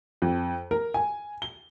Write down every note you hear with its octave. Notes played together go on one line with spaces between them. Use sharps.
F2
A#4
G#5
G7